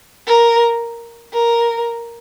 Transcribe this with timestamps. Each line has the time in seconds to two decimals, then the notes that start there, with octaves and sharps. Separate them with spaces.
0.27 A#4
1.33 A#4